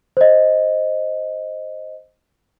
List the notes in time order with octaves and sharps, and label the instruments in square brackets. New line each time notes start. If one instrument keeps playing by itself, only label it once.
[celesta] C5 D#5